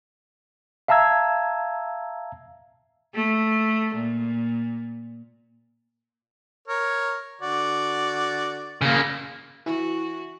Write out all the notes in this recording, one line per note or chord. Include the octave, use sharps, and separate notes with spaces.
E5 F5 A5 A#5 E6 G#6
A3
A#2
A#4 C#5
D3 F#4 D5
C#3 A#3
E3 E4 F#4